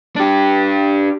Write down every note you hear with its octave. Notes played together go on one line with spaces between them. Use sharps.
D4 G4